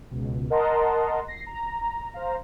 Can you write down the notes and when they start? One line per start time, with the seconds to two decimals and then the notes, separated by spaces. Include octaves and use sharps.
0.11 C#2 B2
0.50 A#4 D#5 F#5 A5 A#5 C6
1.28 A#6 C7
1.47 A#5
2.12 C5 F5 A#5